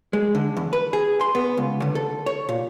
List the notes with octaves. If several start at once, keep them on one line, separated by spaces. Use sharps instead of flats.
G#3
D3
E2
B4
G#4
C6
B3
C#2
D3
A4
C#5
A#2